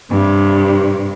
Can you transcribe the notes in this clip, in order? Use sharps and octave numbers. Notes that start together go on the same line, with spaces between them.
G2 C3